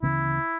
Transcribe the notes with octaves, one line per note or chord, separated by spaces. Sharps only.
D2 C#3 E3 B3 E4